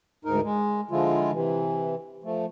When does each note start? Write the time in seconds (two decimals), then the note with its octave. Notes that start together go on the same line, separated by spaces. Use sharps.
0.25 D2 G#2 D#4 A#4
0.43 G#3
0.91 D3 F3 G#3 E4 F4
1.33 C3 E3
2.24 F3 A3